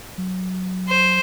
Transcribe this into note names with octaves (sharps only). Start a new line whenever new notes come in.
F#3
C5